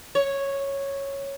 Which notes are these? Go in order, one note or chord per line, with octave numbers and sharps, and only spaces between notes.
C#5